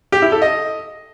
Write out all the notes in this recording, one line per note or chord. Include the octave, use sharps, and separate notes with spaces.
G4
E4
A4
D#5